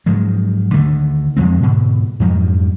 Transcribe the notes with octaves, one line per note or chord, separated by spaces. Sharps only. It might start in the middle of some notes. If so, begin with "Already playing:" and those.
G#2 F3 F#3 G#3
D2 D3 D#3 A3
F2 F3 G#3 C4
G#2 B2 D3
F2 G#2 F3 F#3